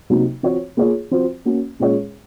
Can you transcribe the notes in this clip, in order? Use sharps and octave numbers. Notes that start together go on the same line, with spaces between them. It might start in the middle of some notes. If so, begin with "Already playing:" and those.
C3 F#3 A#3 D#4
F3 C4 F#4 C#5
A#3 F4 G#4 C#5
F3 C4 F#4 C5
A#3 C#4 F#4
A#2 G#3 C#4 G#4 C#5